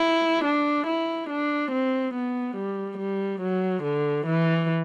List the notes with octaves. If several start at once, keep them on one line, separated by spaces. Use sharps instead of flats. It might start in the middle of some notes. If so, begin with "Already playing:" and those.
Already playing: E4
D4
E4
D4
C4
B3
G3
G3
F#3
D3
E3